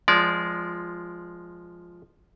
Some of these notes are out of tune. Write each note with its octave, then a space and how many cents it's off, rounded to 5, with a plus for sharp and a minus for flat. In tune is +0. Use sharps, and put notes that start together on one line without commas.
F3 +0 G#3 +0 D5 -25